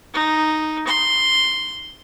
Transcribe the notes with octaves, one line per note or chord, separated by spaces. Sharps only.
D#4
C6